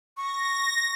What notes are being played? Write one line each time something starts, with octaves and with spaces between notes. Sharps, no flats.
C#6 A#6